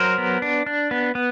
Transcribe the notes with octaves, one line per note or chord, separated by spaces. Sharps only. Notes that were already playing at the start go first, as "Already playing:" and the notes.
Already playing: F#3 A#4 C5
B3
D4
D4
B3
B3